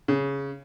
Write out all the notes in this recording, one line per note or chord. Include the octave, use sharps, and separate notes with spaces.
C#3